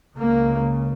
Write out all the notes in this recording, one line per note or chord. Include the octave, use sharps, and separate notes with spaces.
C#2 C#3 A#3